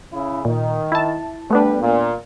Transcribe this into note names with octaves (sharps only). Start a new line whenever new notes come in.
C#3 E4
A#2 D#3
E4 A5
G3 A3 B3 D4 B4
A#2